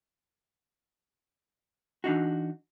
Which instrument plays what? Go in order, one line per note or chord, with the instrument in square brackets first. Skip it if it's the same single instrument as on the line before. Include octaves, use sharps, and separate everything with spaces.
[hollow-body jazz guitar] E3 D4 D#4 F#4